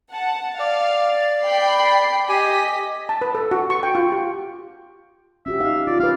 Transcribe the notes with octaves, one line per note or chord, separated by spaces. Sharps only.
F#5 A5
D5 F5
G5 B5 C7
G4 D#5 G#5 B6
A5
B4
A4
F#4
C#6
G5
F4
G4
C#4 F#4 G4 E5
D#4 F5
F4 D5
C#4 B4 F5